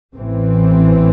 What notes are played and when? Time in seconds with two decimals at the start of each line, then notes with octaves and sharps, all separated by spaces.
0.14 A1 A2 E3 C4